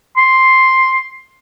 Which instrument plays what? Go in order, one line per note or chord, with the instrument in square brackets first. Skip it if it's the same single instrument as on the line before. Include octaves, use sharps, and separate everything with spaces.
[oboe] C6